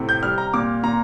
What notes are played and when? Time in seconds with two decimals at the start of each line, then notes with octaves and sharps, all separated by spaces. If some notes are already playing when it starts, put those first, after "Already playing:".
Already playing: A2 C3
0.09 G6
0.23 G3 F6
0.38 A#5
0.54 A#2 D6
0.83 A#2 A#5